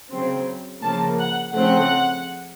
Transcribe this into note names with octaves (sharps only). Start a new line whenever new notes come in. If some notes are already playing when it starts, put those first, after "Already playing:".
C#3 F#3 C4
C#3 F3 A#3 A5
F#5
C#3 F3 A3 C4 F#5